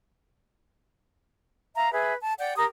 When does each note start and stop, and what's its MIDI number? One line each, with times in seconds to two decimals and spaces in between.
1.75 1.91 76
1.75 1.91 77
1.75 1.91 82
1.91 2.13 68
1.91 2.13 71
1.91 2.13 76
2.21 2.33 81
2.38 2.53 74
2.38 2.53 78
2.38 2.53 79
2.56 2.65 67
2.56 2.65 70
2.56 2.65 82
2.56 2.65 87